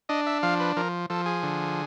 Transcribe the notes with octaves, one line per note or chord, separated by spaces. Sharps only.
D4 D#5
E5
F3 F5
B4
F3 A#4
F3 A4
G#4
D3